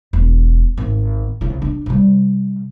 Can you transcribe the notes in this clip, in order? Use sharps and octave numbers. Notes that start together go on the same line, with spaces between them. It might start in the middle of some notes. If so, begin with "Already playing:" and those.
E1
G#1
C2 C#3
D4
C3 G3